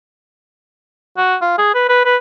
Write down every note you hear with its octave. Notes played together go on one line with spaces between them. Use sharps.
F#4
F4
G#4
B4
B4
B4